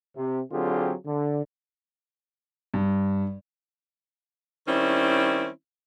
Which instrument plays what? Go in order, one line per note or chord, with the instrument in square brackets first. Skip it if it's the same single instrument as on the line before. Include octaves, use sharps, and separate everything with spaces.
[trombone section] C3
D3 F#3 C4 F4 G4 G#4
D3
[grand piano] G2
[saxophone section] D#3 G3 C4 C#4 E4